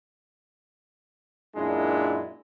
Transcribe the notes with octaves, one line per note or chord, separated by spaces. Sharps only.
F#2 A#2 G#3 D4 E4